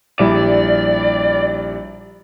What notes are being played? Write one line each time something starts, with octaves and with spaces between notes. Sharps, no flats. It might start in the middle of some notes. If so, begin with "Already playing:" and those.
A#1 G3 E4 D5